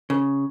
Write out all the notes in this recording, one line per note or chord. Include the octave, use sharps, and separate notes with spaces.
C#3